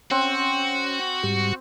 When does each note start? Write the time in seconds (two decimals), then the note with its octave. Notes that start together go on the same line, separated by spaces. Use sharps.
0.11 C4 C#4 F#4
1.23 G#2 G3